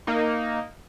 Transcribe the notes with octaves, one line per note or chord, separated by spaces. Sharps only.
A#3 D#4